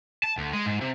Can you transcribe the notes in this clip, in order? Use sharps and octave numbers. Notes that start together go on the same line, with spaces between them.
A5
D2
G#3
G#2
C3